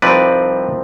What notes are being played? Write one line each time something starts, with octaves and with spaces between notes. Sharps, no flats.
C2 C3 F3 C4 D#4 B4 D5